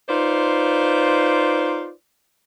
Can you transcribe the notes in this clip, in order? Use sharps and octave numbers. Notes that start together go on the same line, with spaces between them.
D#4 F4 B4 C5 D5